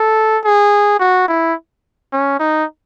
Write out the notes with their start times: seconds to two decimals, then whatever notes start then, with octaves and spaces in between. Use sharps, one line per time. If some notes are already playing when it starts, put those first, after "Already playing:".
Already playing: A4
0.44 G#4
1.00 F#4
1.28 E4
2.13 C#4
2.40 D#4